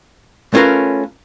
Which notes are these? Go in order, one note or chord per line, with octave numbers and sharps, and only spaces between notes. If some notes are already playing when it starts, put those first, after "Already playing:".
A3 C#4 F4 A#4 B4